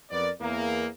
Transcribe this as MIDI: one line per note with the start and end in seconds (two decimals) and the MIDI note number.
0.11 0.30 41
0.11 0.30 59
0.11 0.30 70
0.11 0.30 74
0.40 0.87 40
0.40 0.87 58